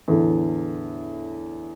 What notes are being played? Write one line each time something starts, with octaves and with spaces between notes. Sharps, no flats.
E2 A2 D3